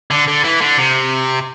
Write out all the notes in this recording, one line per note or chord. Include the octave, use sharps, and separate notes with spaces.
D3
D3
E3
D3
C3